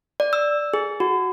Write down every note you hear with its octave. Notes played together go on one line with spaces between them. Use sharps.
D5
E6
G#4
F#4